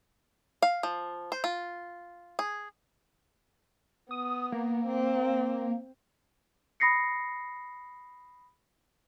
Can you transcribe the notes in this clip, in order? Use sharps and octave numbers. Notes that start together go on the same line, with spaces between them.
F5
F3
C5
F4
G#4
B3 D#6
A#3
C4
B5 D#6 A#6 C7 C#7